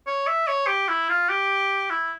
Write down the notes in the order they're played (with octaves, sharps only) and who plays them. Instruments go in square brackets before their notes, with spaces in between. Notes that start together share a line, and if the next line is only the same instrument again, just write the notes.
[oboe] C#5
E5
C#5
G4
E4
F4
G4
E4